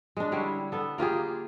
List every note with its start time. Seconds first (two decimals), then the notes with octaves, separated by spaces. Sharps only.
0.17 G#3 D4
0.32 D3 G3 E4 C#5
0.72 B3 A4
0.98 A#3 F4 G4 G#4